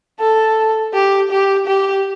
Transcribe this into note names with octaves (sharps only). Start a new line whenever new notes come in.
A4
G4
G4
G4